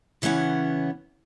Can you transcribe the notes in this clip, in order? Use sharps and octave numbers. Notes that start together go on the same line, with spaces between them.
C#3 E3 B3 C#4 F#5